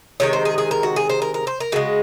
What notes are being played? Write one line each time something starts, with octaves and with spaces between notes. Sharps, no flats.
C3 D#3 G#3 C#5
C5
G#4
G#4
A#4
F#4
G#4
C5
A#4
A#4
C5
A#4
C#3 G#3 F#4